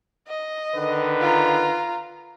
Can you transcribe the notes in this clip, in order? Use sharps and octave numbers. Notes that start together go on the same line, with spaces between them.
D#5
D3 D#3 B4
F4 A#5